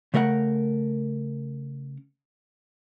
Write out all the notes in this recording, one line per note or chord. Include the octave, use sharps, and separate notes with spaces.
C#3 A3 A#4 D#5 F#5